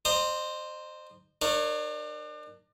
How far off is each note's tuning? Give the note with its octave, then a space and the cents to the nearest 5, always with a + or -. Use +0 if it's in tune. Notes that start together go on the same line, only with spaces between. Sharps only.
C5 +0 D#5 -35 A#5 +0
D4 +35 A#4 +0 C#5 +0